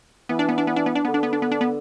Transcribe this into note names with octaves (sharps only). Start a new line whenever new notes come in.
E3 B3
D4
B3
D4
B3
D4
B3
D4
D3 B3
D4
B3
D4
B3
D4
B3